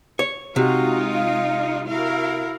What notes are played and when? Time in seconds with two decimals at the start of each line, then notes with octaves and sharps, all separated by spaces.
0.19 C#5
0.56 C3 G#3 D#4 F4 F#4
1.14 F5
1.88 E4 F#4 A#4 F5